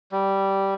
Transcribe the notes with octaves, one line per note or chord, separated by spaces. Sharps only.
G3